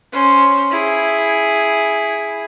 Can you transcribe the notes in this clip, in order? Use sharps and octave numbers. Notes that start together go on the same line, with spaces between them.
C#4 C5
E4 G#4